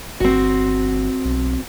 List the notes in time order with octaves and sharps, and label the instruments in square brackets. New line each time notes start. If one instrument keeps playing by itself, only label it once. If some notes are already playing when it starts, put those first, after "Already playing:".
[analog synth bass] G1 [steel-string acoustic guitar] C4 F#4
[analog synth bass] B1